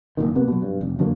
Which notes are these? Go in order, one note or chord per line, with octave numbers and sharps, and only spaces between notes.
F#1 C2 A#2 D#3
C3 A#3 B3
B2 F#3
G2
F1
F#2 D3 F#3 A#3